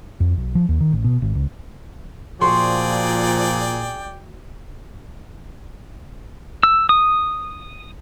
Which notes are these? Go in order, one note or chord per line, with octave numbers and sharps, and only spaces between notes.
F2
B1
F3
D#2
D#3
A1
B2
G#1
C#2
A#2 F3 F#4 G#4 D5 G5 C6
E6
D#6